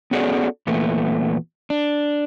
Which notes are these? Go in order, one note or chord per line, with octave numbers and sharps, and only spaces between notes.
B3 C#4 F#4 G#4 A4 D5
E2 A#2 A3 B3
D4